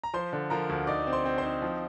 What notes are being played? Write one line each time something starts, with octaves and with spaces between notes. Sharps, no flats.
A#5
F3 C5 C6
D3
F3 A#4 A#5
D2
D#4 D5 D6
C4
C5 C6
C4
C5 C6
D#4
F3